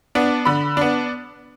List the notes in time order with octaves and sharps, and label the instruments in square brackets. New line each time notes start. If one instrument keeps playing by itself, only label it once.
[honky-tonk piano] B3 D4
D3 B5
B3 D4